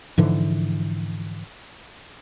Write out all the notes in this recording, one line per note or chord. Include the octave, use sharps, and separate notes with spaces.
G#2 D3 E3 F3